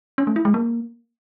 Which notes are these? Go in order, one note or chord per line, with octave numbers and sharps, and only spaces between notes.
C#4
A3
E4
G#3
A#3